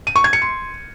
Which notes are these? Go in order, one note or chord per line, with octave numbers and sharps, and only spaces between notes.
D#7
C#6
G#6
C#7
C6